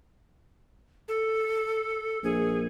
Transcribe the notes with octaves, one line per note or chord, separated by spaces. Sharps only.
A4
A#1 G#4